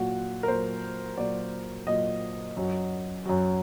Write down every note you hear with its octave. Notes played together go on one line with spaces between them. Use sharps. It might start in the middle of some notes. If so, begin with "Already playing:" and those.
Already playing: A#2 F#3 F#4
A#4
A#2 F#3 C5
A#2 F#3 D5
A#2 F#3 D#5
F#2 F#3
F#2 F#3